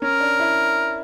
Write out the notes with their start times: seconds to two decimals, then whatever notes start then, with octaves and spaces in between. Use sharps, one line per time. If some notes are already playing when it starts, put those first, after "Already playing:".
0.02 C#4 A#4
0.20 D4
0.40 E4